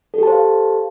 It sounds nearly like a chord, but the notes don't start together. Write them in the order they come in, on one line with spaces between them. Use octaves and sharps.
A4 G4 A5 C5 F5